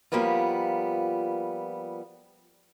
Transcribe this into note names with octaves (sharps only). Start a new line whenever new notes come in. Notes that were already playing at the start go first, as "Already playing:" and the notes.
F3 G3 A#3 B3 F4